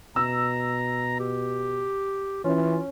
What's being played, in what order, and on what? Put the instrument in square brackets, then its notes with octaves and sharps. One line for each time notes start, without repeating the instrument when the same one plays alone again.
[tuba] B2 [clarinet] A#5 [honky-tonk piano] E6
[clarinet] G4
[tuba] E3 [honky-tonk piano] C#4 [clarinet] F4